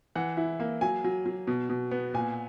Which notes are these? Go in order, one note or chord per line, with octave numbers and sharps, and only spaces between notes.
E3 F#5
E4
A#3
F#3 G#5
F#3
F#3
B2
B2
B3
A#2 G#5